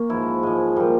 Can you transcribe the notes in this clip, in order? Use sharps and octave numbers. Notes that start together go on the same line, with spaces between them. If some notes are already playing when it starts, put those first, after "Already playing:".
Already playing: A#3 C#4
G#2 F3 E4
G#2 F3 G#3
A#2 F3 G3